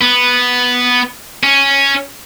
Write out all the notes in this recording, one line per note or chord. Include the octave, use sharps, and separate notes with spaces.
B3
C#4